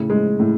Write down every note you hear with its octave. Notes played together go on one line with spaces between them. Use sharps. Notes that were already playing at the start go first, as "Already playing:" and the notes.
Already playing: A2 C#3
G#3
A2